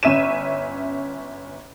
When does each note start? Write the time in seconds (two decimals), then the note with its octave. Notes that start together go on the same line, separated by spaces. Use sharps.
0.03 G1 C#4 E5 D#7 E7